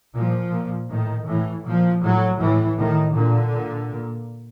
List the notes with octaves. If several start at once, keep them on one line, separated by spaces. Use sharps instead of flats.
A#2 F3
A#2
A2 D#3
A2 E3
A#2 F3
A2 F#3
A2 E3
A2 D#3
A#2 D3
A#2
A#2